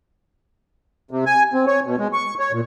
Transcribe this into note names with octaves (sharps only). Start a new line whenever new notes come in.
C3
G#5
C4
C#5
B2
G#3
C#6
C#5
A#2